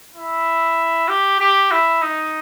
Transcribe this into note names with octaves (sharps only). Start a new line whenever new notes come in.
E4
G4
G4
E4
D#4